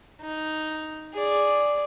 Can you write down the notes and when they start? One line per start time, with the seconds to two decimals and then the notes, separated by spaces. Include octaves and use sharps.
0.22 D#4
1.14 G#4 D5